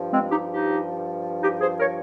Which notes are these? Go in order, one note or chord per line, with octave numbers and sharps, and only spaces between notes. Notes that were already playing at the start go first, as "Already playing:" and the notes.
Already playing: G2 F3
G#3 C4
D#4 G4
D#4 G4
D#4 G4
G#4 C5
A#4 C#5